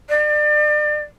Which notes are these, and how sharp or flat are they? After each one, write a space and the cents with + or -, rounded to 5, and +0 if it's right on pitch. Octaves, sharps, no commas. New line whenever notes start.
D5 +35